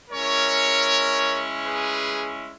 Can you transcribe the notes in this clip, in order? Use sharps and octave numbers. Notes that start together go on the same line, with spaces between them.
G#3 C#4 E4 A#4 C#5
G#4 B4